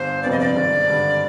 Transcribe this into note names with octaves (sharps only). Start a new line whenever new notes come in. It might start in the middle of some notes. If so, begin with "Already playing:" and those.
Already playing: G1 C5
F2 C3 G3 B3 D5
D#5
D5
G#1
G2 D3